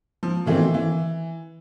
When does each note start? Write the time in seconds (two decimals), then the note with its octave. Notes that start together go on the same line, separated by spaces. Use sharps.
0.23 F3
0.45 B2 D#3 E3 A3 C4
0.74 E3